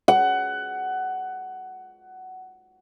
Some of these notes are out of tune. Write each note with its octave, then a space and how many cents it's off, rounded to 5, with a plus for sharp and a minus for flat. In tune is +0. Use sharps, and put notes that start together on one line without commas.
F#5 +15